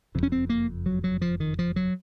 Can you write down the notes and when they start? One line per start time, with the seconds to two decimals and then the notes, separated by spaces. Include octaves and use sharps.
0.15 F#1 F2 C3
0.23 C#4
0.32 C4
0.49 A#3
0.86 F#3
1.04 F#3
1.22 F3
1.40 D#3
1.59 F3
1.76 F#3